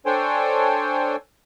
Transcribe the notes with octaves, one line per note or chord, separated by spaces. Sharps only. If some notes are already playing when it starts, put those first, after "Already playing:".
D4 A4 C5 C#5 G5 G#5